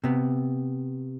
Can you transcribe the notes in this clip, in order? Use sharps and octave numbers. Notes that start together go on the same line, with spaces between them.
C3 B3